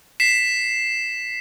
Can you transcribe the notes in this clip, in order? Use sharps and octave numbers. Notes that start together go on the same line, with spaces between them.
B6 C7 E7